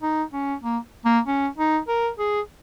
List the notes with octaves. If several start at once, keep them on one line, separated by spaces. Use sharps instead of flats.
D#4
C#4
A#3
A#3
C#4
D#4
A#4
G#4